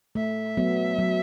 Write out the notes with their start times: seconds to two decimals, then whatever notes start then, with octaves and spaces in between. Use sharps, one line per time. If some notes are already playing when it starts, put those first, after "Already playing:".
0.15 A3 E5
0.57 F#3 B3
0.99 F#3